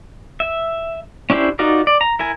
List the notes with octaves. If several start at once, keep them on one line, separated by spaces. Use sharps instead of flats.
E5
C#4 D4 E4 G4 C5
D#4 F4 F#4 A#4 D5
D5
A#5
E4 A#4 G#5